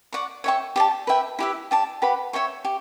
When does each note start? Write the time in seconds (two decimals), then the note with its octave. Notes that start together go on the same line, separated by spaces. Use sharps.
0.13 D5 F#5 C#6
0.44 C#5 E5 G5 C#6
0.76 G4 D5 A5
1.07 B4 E5 G5
1.39 E4 G4 B4 E5
1.71 G4 D5 A5
2.02 G4 B4 F#5 B5
2.33 C#5 E5 G5 C#6
2.65 G4